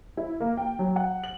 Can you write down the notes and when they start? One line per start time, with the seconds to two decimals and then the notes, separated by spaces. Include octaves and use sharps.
0.17 E4
0.40 A#3
0.57 G5
0.79 F#3
0.96 F#5
1.24 F#7